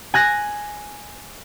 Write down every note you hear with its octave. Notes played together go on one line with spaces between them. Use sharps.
G#5 F#6 A#6